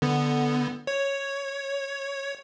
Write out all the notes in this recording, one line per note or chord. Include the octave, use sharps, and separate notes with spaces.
D3 B3
C#5